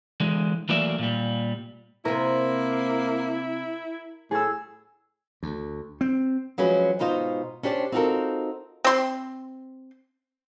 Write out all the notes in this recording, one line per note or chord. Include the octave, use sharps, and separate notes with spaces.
D3 E3 G#3
E3 F#3 A3 A#3 D5 E5
A#2 G3
C3 A#3 C4 E4 A#4 D#7
A2 G#4 E6
D2
C4
F3 F#3 G#3 C#4 F#4 B4
G#2 B2 D#4 F4 C5 D#5
C#4 D4 G4 C5 D5
C4 D#4 F4 F#4 A4 A#4
C4 C6